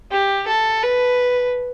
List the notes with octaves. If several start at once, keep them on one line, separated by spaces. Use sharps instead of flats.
G4
A4
B4